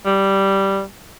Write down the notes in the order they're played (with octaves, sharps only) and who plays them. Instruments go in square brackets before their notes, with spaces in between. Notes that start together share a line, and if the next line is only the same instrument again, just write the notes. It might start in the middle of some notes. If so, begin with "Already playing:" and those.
[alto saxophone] G3